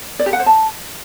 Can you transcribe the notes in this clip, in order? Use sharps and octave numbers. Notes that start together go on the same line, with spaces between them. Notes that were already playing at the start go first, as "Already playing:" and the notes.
D5
G4
F#5
C5
A5